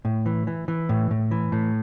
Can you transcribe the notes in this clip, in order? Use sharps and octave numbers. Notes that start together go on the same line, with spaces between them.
A2
E3
E3
E3
A2
A2
E3
A2